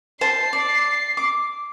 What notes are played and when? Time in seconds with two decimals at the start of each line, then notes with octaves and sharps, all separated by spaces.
0.21 C5 A5 C7
0.53 D5
1.17 D6